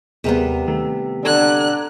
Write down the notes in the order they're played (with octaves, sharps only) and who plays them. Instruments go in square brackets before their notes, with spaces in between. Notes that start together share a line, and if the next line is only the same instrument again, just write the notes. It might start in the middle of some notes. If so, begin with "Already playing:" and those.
[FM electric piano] D#2 G#4 A#4 [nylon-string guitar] C3 G3 B3
[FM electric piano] D#3 A3
[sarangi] D3 [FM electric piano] A4 A#5 G#6 [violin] F#6